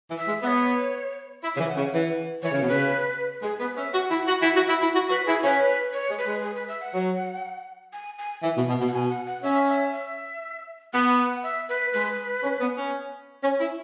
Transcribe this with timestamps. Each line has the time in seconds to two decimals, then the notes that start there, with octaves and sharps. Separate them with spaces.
0.09 E3
0.18 E5
0.27 G#3
0.42 B3 E5
0.47 C#5
1.43 E4 E5
1.55 C#3
1.59 E3
1.68 F#5
1.76 C#3
1.93 E3 F#5
2.43 E3 C#5
2.52 C#3
2.61 B2
2.68 C#3 B4
3.42 G#3 G#4
3.59 B3 B4
3.76 C#4 E5
3.93 F#4 F#5
4.10 E4
4.18 F#5
4.27 F#4
4.42 E4 F#5
4.55 F#4
4.67 E4
4.81 E4
4.93 F#4
5.09 F#4 B4
5.26 E4 G#4
5.42 C#4 C#5
5.47 B4
5.93 C#5
6.09 G#3
6.18 B4
6.26 G#3
6.43 G#4
6.55 B4
6.68 E5
6.80 F#5
6.94 F#3
7.93 G#5
8.18 G#5
8.42 E3
8.56 B2
8.68 B2
8.80 B2
8.88 F#5
8.93 B2 G#5
9.10 F#5
9.26 F#5
9.43 C#4 E5
9.68 E5
9.93 E5
10.93 B3 F#5
11.18 F#5
11.43 E5
11.69 B4
11.93 G#3 B4
12.43 C#4
12.60 B3
12.76 C#4
13.43 C#4
13.59 E4